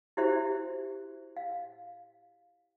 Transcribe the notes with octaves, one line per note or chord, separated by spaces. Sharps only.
E4 F#4 G4 C5 E5
F5